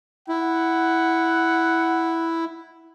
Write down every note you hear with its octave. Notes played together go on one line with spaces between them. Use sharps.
E4 F#5